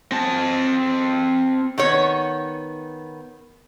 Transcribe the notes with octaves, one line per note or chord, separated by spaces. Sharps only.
C4 A5
D#3 B3 C#5